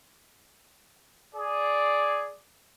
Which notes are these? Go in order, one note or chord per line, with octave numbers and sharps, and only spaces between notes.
G#4 D5